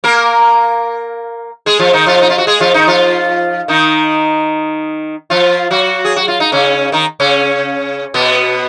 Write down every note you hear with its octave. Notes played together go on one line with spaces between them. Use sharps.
A#3 A#4
G#3 G#4
F3 F4
D#3 D#4
F3 F4
D#4
F4
F#4
G#3 G#4
F3 F4
D#3 D#4
F3 F4
D#3 D#4
F3 F4
F#3 F#4
G#4
F#4
F4
D#4
C#3 C#4
D#3 D#4
C#3 C#4
B2 B3